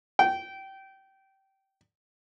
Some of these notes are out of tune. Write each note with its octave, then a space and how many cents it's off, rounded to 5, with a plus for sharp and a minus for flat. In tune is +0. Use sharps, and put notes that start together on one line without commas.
G5 -20